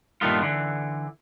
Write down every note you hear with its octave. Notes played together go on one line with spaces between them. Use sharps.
G2 A#2 D#3 A3 B3 F4
D3 E3